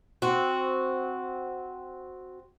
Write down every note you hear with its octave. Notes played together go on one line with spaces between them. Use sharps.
C4 F#4